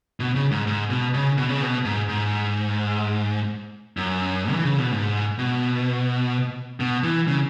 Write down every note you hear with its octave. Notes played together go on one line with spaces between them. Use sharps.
B2
C#3
G#2
G#2
B2
C#3
B2
C#3
B2
G#2
G#2
F#2
E3
C#3
B2
G#2
B2
B2
E3
C#3